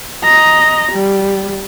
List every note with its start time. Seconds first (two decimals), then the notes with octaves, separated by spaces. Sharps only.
0.24 D#5 A#5
0.92 G3